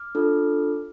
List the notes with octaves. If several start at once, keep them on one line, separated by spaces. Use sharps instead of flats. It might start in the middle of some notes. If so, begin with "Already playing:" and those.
Already playing: D6 F6
D4 F4 A4